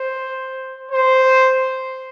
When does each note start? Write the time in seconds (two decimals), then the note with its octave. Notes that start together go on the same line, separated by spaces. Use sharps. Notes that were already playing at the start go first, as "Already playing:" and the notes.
Already playing: C5
0.91 C5